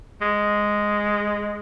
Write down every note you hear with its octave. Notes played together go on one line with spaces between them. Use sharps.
G#3